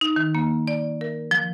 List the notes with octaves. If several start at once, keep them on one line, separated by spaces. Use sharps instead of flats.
D#4
D#3
A#3
D5
A#4
F3